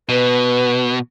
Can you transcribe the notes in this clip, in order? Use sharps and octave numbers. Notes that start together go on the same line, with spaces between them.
B2 B4